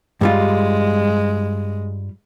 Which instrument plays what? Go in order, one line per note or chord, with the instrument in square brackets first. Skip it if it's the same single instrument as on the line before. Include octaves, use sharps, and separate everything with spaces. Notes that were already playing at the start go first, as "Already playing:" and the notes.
[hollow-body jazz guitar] G2 G3 F4 [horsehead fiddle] G#3